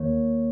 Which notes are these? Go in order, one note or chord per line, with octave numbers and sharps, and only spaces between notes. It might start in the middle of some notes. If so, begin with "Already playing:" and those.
Already playing: D#2 D#3 A#3 C#5